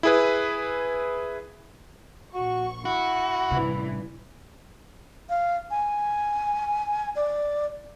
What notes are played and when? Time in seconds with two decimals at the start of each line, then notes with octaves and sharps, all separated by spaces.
0.03 E4 G#4 B4
2.35 A#1 F#4 C#6
2.85 E4 F#4
3.51 A1 G2 C3 E3
5.29 F5
5.71 G#5
7.16 D5